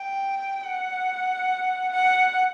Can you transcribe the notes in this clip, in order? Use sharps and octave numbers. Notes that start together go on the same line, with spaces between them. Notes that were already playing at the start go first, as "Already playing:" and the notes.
Already playing: G5
F#5
F#5